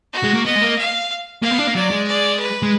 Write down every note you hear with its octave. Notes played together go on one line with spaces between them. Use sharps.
F#4
G#3
A#3
B3 D#5
G#3
A#3
F5
A#3 F5
B3
D4
A#3
F#3 D5
G#3
D5
B4
G#3